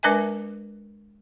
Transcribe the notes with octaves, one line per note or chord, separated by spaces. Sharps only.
G#3 D4 A#4 B4 E5 G#5